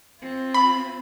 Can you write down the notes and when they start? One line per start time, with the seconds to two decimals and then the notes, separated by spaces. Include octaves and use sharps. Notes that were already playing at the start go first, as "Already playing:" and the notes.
0.20 C4 F4
0.54 B5